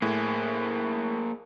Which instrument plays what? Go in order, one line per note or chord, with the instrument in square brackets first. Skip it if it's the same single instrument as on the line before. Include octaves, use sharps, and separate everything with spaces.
[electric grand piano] A2 [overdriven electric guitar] A#3 G#4